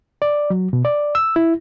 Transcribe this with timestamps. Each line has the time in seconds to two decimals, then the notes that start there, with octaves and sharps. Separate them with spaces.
0.22 D5
0.50 F#3
0.73 B2
0.85 D5
1.15 E6
1.36 E4